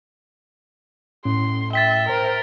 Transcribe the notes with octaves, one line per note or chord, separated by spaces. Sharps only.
A2 C#4 C6
E5 G5 A6 B6 G7
A#4 C5